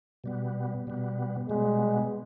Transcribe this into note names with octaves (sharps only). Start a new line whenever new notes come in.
B2 G3 B3
B2 G3 B3
B2 G3 G#3 B3